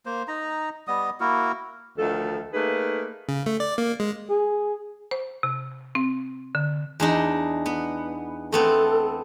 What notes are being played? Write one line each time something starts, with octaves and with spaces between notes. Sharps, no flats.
A#3 C5
D#4 A#5
G3 B3 D#5 D#6
A#3 E4 F#4 A#4
D2 D#3 F3 A4
A3 A#3 D#4 G#4 B4
C#3
A3
D5
A#3
G#3
G#4
C5
C3
C4
D3
E2 D4 D#4
B3
A3 B3 C4 A4